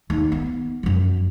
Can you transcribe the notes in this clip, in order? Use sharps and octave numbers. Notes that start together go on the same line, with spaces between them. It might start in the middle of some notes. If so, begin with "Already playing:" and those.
D#2
B3
F#2 F3